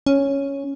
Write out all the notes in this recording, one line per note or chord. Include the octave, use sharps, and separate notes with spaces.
C#4